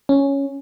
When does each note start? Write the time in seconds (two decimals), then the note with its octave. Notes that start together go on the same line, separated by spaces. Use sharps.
0.09 C#4